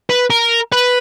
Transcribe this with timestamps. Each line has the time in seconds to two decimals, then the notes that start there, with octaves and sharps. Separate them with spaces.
0.10 B4
0.30 A#4
0.72 B4